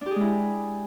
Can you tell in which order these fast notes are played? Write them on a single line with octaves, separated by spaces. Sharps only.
D4 G4 G#4 G#3 E4